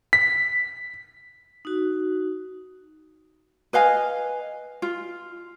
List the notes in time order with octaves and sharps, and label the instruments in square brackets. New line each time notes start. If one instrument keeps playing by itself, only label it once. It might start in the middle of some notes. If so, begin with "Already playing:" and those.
[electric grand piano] B6
[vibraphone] D#4 F#4
[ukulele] B4 D#5 F5 G#5
F4